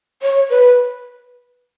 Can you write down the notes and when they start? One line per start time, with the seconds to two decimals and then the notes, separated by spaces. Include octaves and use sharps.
0.23 C#5
0.50 B4